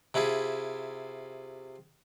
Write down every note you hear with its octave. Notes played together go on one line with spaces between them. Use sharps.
C3 E4 F4 G#4